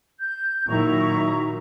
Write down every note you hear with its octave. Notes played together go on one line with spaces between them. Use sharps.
G6
A#2 D#3 F#3 E4 A#5 C#6